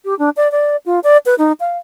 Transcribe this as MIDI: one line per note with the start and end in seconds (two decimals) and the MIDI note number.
0.05 0.17 67
0.19 0.30 62
0.37 0.51 74
0.52 0.76 74
0.86 1.00 65
1.04 1.17 74
1.26 1.35 71
1.38 1.52 63
1.60 1.77 77